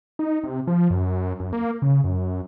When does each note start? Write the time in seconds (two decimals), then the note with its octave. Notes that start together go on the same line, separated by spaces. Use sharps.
0.19 D#4
0.44 C3
0.67 F3
0.90 F#2
1.40 F#2
1.53 A#3
1.82 C#3
2.04 F#2